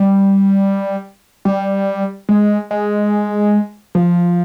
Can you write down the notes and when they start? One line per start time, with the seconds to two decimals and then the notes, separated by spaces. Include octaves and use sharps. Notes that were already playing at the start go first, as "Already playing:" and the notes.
Already playing: G3
1.45 G3
2.29 G#3
2.71 G#3
3.95 F3